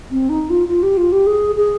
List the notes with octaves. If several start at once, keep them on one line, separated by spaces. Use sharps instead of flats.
C4
D#4
F4
F4
G4
F4
G4
G#4
G#4